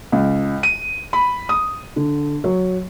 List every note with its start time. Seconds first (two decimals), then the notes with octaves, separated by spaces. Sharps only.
0.12 C#2
0.63 D#7
1.13 B5
1.49 D#6
1.96 D3
2.44 F#3